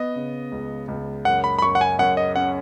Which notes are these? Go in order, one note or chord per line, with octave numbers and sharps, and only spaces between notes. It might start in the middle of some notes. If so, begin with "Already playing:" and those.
Already playing: B3 D#5
C#3
C#2
C#2
F#2 F#5
B5
B5
F#2 C#6
F#5
G#5
F#2 F#5
D#5
C#4 F#5